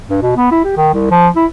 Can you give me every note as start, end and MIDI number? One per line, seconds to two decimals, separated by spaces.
0.09 0.21 43
0.22 0.33 47
0.37 0.51 59
0.51 0.63 64
0.65 0.76 67
0.77 0.90 51
0.94 1.07 36
1.11 1.28 53
1.36 1.46 64